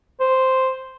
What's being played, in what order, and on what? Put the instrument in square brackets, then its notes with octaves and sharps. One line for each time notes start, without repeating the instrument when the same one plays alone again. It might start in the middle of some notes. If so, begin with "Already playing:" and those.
[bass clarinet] C5